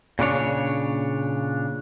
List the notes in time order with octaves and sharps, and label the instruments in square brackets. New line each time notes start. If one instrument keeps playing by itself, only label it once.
[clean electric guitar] A#2 C#3 D4 C#5